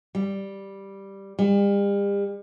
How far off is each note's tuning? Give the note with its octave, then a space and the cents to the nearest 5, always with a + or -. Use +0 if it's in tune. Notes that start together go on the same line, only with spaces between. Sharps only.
G3 +0
G3 +40